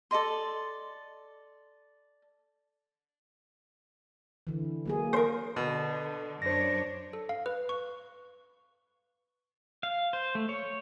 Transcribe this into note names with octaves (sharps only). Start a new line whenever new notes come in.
A4 D5 D#5 C6
D3 E3
F#3 A#3 G#4
A#4 C5
B2 D3
F#2 D4 C5 C#5 A#6
A4
F5
B4
C#6
F5
C5
A3
C#5